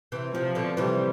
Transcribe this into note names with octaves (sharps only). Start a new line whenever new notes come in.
C3 E3
C3 F3
B2 D3
C3 E3 G3